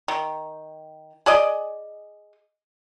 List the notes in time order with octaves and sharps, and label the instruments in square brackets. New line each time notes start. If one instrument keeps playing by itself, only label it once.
[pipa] D#3
G#4 D5 D#5